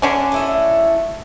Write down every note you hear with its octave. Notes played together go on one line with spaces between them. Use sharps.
D3 C#4 D4
A3 E4 D#5